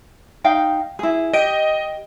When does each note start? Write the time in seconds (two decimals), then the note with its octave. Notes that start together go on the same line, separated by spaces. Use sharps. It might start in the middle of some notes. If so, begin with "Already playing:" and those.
0.44 D#4 F5 G5
0.99 E4 G#4
1.33 G4 D#5 D7